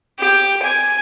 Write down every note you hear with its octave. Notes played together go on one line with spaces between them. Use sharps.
G4
G#5